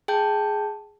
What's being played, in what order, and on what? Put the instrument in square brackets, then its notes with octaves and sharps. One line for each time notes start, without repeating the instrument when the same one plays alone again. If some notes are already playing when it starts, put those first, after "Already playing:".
[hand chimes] G#4 G5 A5 G6